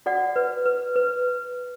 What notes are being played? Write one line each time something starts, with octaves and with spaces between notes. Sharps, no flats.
F#4 D5 F#5
B4
B4
B4